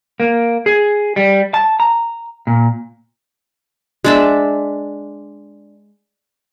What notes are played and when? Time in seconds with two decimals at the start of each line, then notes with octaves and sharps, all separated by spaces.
0.20 A#3
0.66 G#4
1.16 G3
1.54 A5
1.80 A#5
2.47 A#2
4.04 G#3 D4 E5